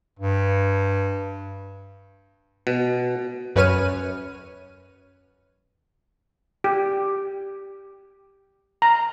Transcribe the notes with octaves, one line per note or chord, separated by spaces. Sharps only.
G2
B2
F#2 B4 C#5 F6 D#7
G4
A#5